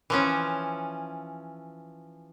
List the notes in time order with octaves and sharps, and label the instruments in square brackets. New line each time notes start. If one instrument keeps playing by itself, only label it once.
[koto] E3 F3 C#4